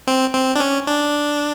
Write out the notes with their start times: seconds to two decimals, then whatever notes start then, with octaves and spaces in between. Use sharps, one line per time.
0.07 C4
0.34 C4
0.56 D4
0.60 C#4
0.87 D4